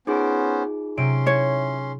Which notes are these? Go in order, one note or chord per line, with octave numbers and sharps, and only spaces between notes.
B3 C#4 D#4 F4 G#4 C5 D6
C3 F#3 C#4 C6 D7
E4 C#5